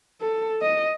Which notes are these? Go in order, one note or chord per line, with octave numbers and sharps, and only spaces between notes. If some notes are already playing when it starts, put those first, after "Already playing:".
A4
D#5